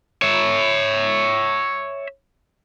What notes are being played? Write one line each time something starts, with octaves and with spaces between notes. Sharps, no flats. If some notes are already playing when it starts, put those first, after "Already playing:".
C#5 E5